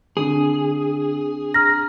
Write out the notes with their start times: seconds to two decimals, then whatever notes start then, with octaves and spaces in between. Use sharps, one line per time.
0.17 D3 C4 D4 G#4
1.54 A#5 F6 A#6